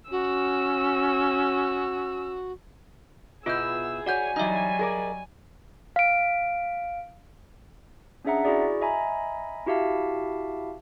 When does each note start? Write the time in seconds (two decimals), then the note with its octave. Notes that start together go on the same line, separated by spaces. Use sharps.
0.11 C#4 F#4 E6
3.46 B2 B3 E4 F4 G#4 E6 G6
4.06 F#4 C#5 D5 F#5 G#5 G6
4.36 E3 F#3 G3 D#4 D#5 E5
4.79 G#4 A#4 D5
5.96 F5 D7
8.25 C#4 D4 G#4 E5 F#5 A#5
8.44 E4 F#4 G#4 D5
8.81 D#5 E5 G#5 A#5 B5
9.67 E4 F#4 G4 E5 F5 A5